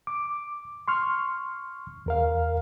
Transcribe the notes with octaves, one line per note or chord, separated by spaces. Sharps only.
D6
C6 C#6 F6
E2 A#4 F5